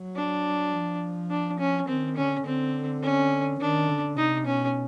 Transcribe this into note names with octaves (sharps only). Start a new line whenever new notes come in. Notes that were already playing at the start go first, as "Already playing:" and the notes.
Already playing: F#3
D4
F3
D4
C#4
D#3 C4
D3 C#4
D3 C4
C#4
D#3 D4
D3
C3 D#4
B2 C#4